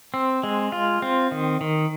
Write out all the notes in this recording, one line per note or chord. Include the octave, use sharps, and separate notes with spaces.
C4
G#3
F4
C4
D#3
D#3